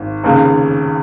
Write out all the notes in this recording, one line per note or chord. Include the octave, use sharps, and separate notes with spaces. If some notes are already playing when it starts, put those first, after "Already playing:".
Already playing: G#1
F1 D#2 C#3